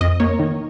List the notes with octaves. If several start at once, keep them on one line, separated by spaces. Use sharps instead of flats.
F2 D#5
A#3 C#5
D#3